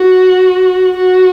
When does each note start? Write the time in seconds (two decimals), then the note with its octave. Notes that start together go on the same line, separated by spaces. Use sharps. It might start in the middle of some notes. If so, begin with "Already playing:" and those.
Already playing: F#4
0.97 F#4